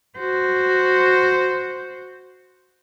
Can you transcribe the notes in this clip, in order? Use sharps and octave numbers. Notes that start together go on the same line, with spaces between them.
F#4 C5